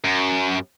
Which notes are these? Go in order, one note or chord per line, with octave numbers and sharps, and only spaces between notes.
F#2